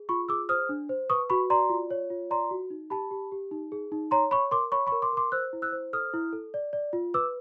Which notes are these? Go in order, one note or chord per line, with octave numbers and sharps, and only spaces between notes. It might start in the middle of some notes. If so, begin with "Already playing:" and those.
Already playing: G#4
F4 B5 C#6
G#4 D6 E6
C5 D#6 F6
D4
C5
B4 C#6 D#6
F#4 B5 C#6
D5 A#5 C6
F4
C#5
F4
D5 A#5 C6
F#4
D#4
G4 A5 B5
G4
G4
D#4
G#4
D#4
C#5 A#5 C6
C#5 B5 C#6
A#4 C6 D6
C#5 B5 C#6
B5 C#6
A#4
C6 D6
A#4 C6 D6
C5 E6 F#6
E4
E6 F#6
C5
A4 D#6 F6
E4
A4
D5
D5
F4
B4 D6 E6